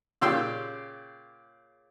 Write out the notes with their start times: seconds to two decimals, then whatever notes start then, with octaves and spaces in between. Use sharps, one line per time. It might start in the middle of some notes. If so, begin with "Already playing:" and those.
0.21 A#2 C#3 G4 C6 E6